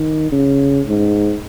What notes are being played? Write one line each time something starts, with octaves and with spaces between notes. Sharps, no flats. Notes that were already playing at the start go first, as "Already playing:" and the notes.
Already playing: D#3
C#3
G#2